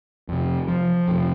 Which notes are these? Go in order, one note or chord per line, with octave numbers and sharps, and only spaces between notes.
F2 C3
F3
F2 C3